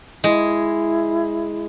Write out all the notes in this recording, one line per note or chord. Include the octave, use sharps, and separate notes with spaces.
G#3 E4